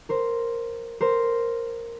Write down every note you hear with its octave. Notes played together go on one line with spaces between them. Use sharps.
A#4 C5
A#4 C5